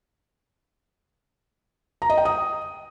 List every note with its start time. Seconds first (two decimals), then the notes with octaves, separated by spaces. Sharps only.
2.02 A#5
2.10 D#5
2.17 G5
2.25 D#6